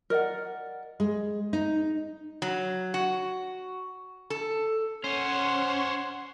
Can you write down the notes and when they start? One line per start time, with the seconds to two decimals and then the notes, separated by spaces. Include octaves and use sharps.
0.10 A#4 D5 D#5 F#5
1.00 G#3
1.53 D#4
2.42 F#3
2.94 F#4
4.30 A4
5.04 C#4 C5 C#5 F#5 C6